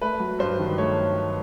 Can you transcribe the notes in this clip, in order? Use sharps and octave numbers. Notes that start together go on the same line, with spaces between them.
A3 B4
F#3
G2 C5
D#3
A3 C#5